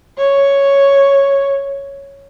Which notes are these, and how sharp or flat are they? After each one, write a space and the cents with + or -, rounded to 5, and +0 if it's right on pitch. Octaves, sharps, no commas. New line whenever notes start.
C#5 +0